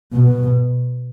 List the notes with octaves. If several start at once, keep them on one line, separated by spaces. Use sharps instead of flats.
B2